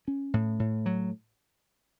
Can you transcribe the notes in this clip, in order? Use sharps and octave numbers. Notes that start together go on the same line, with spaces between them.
C#4
A2
A2
F#3